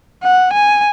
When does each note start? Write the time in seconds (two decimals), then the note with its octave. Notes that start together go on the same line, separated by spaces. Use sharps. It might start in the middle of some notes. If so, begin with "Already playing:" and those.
0.23 F#5
0.53 G#5